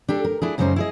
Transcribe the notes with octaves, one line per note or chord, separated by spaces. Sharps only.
D4 G4 A4
A#4
D4 E4 G#4
F#2 C#3 F#3 G3 D#4 C5
E4 G#4 D#5